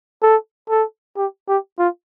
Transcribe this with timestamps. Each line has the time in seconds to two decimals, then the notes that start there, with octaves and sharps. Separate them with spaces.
0.22 A4
0.69 A4
1.17 G4
1.48 G4
1.79 F4